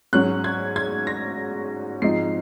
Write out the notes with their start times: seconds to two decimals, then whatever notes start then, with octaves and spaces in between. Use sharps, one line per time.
0.13 G#2 F#3 C#4 F#6
0.44 G#6
0.76 G#6
1.07 A#6
2.02 G#2 F3 C4 D#4 C7